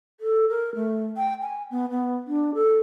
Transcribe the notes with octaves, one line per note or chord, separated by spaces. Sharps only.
A4
A#4
A3
G5
G#5
B3
B3
D4
A4